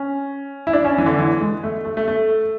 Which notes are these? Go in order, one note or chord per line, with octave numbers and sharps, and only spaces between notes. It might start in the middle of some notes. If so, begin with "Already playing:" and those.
Already playing: C#4
E4
D4
C#4
E3
D3
E3
G#3
A3
A3
A3
A3